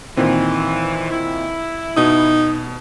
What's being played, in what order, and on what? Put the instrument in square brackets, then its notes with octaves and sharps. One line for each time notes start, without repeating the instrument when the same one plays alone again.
[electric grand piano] A#2 D#3 C4 [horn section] E3
[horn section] E4
[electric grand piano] B2 D#6 [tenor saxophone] D#4